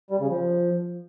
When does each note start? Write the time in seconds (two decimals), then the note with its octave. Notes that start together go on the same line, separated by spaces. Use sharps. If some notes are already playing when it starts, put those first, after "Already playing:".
0.11 G3
0.20 C#3
0.30 F3